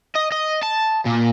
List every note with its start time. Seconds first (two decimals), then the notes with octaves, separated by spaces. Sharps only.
0.16 D#5
0.32 D#5
0.63 A5
1.05 A#2